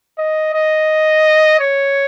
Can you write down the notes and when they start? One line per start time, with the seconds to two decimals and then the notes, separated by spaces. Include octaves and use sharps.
0.18 D#5
0.54 D#5
1.60 C#5